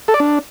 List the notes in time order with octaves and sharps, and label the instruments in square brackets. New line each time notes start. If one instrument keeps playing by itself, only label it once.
[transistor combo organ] A4
D5
D4